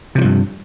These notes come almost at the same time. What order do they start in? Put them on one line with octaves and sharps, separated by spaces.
C3 E3 F3 G2